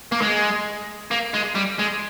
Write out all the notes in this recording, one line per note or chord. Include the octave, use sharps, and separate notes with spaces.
A#3
G#3
A#3
G#3
G3
G#3